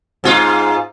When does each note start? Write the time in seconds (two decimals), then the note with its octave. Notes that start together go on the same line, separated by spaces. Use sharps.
0.24 G#2 F4